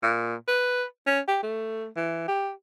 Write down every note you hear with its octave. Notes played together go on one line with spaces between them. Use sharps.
A#2
B4
C#4
G4
A3
E3
G4